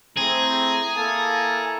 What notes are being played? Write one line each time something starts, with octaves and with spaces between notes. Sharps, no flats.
A3 C4 E4 G#4 A#5
A#3 E4 A4 A5 A#5